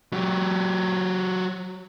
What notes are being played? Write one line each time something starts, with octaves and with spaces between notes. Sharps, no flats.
F#3 G4